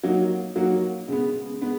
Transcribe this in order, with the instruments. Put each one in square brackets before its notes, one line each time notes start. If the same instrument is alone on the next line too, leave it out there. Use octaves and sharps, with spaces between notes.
[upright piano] F#3 A#3 D#4 F#4
F#3 A#3 D#4 F#4
C#3 G#3 B3
G#3 B3